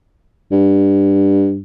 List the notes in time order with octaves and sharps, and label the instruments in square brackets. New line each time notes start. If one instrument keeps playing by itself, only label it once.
[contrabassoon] G2